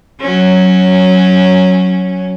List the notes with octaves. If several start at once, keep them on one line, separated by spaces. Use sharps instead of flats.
F#3 C#4